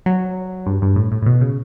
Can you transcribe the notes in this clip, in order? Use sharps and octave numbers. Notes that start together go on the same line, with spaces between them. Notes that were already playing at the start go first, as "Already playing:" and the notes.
F#3
G2
G2
A2
A2
A2
B2
C#3